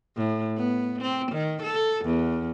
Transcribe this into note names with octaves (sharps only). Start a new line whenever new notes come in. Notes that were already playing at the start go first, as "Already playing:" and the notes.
A2
B3
C4
D#3
A4
E2